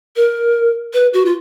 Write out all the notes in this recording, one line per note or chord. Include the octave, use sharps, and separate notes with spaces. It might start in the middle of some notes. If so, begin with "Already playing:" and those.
A#4
B4
F#4
F4